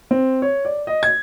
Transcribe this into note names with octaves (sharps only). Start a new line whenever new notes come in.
C4
C#5
D5
D#5
G#6